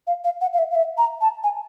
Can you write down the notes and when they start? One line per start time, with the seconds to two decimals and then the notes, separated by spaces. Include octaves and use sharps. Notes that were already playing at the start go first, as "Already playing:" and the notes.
0.07 F5
0.24 F5
0.41 F#5
0.53 F5
0.58 E5
0.71 F5
0.75 E5
0.98 A#5
1.21 A5
1.43 G#5